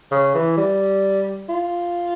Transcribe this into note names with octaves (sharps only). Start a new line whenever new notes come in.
C#3
E3
G3
F4